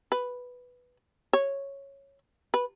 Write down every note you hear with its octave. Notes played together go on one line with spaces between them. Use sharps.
B4
C#5
B4